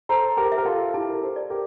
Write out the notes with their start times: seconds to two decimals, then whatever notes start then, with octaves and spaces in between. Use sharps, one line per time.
0.09 A4 C5 A#5
0.37 G4 A#4
0.52 E5
0.58 A#4
0.65 F4 A4
0.94 E4 G4 A5
1.10 A#4
1.22 A4 C5
1.36 D5
1.50 G4 A#4